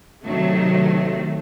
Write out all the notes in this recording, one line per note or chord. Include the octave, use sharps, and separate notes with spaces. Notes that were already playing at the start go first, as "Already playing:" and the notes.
C3 D#3 F#3 A3